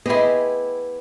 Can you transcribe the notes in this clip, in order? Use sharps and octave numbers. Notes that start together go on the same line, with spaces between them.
B3 E4 G4 G#4 D#5 C6